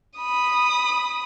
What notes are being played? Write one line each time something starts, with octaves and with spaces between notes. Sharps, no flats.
B5 D#6